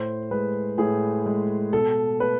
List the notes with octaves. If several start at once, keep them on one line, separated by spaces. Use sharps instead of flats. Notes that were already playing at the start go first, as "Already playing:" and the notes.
Already playing: A2 C5
G#3 B4
A2 G#4
G#3
B2 A4
A3 B4